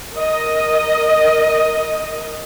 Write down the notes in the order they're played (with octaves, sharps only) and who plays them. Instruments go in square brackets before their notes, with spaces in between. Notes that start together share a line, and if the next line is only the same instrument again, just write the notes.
[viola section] A#4 D#5